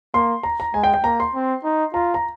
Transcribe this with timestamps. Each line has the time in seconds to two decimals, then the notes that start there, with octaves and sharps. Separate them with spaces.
0.14 A#3 C6
0.43 A#5
0.60 A#5
0.74 G#3 G#5
0.84 G5
0.94 G5
1.04 A#3 A#5
1.20 C6
1.34 C4
1.64 D#4
1.94 F4 A#5
2.14 A#5